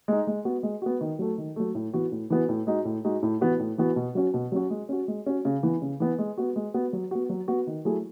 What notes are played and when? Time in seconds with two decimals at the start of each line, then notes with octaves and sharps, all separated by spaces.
0.08 G#3 D#4
0.27 G#3
0.45 B3 F#4
0.63 G#3
0.82 B3 F#4
1.01 D#3
1.19 F#3 A3
1.38 D#3
1.56 F#3 A3
1.75 A2
1.93 E3 B3 F#4
2.12 A2
2.30 E3 B3 F#4
2.49 A2
2.67 G#3 D#4 F#4
2.85 A2
3.05 G#3 D#4 F#4
3.23 A2
3.41 E3 B3 F#4
3.59 A2
3.78 E3 B3 F#4
3.96 B2
4.15 F#3 C#4 F#4
4.34 B2
4.52 F#3 C#4 F#4
4.70 G#3
4.89 C#4 F#4
5.08 G#3
5.26 C#4 F#4
5.45 C#3
5.63 E3 B3
5.82 C#3
6.00 E3 B3
6.19 G#3
6.38 B3 F#4
6.56 G#3
6.74 B3 F#4
6.93 F#3
7.11 B3 F#4
7.29 F#3
7.48 B3 F#4
7.67 D#3
7.85 F#3 A3 E4 G#4